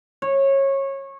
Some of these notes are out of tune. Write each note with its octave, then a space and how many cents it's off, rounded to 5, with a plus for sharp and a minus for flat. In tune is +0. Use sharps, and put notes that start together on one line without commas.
C#5 -20